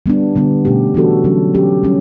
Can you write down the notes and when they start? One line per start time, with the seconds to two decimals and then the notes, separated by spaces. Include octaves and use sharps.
0.06 G3 B3 D4
0.35 D3 G3 B3
0.65 B2 A3 C#4 G4
0.94 E3 B3 D4 F#4 A4
1.24 D3 F#3 C#4
1.54 F#3 C#4 G4
1.83 G3 C#4